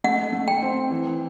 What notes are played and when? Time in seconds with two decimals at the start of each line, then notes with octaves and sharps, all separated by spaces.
0.04 A3 F#5
0.33 A3
0.48 G5
0.62 C4
0.91 E3